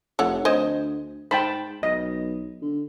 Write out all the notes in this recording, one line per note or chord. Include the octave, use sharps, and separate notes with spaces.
F1 A4 C#5 F#5
D2 C5 D#5 G#5
G#2 C5 G5 A5 B5
B1 D#5
D3